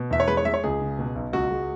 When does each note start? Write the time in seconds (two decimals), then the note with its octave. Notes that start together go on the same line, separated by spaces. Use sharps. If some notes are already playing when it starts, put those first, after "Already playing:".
Already playing: B2
0.11 E2 E5
0.20 C#5
0.27 G#3 B4
0.37 C#5
0.45 G#3 E5
0.54 C#5
0.64 C#2 G#4
0.80 C#3
0.99 B2
1.15 B1
1.33 C#2 F#4
1.51 G#3